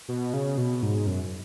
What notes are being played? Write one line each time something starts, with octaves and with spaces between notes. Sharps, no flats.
B2
C#3
B2
G#2
F#2